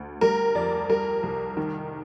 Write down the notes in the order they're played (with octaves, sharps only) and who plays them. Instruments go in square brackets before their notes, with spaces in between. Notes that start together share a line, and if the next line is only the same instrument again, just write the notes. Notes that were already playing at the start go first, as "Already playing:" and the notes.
Already playing: [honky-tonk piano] D2
G3 A#4
F2 D5
G3 A#4
C2
D#3